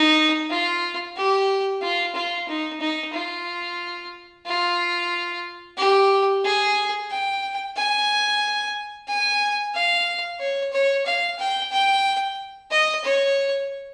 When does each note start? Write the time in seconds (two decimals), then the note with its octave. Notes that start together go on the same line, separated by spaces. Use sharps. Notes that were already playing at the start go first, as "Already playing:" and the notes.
Already playing: D#4
0.50 F4
1.16 G4
1.82 F4
2.15 F4
2.48 D#4
2.80 D#4
3.14 F4
4.46 F4
5.78 G4
6.44 G#4
7.10 G5
7.76 G#5
9.08 G#5
9.74 F5
10.39 C#5
10.73 C#5
11.06 F5
11.39 G5
11.72 G5
12.71 D#5
13.04 C#5